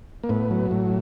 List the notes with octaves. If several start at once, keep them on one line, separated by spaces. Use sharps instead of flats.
A#3
A2 B3
F#3
A2